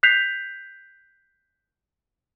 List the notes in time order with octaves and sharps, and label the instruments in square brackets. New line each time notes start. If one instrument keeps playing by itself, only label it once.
[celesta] F#6 G6 B6 C7 F7